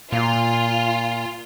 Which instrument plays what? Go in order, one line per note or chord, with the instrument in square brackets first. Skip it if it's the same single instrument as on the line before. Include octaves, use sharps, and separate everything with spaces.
[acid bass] A#2 [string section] F4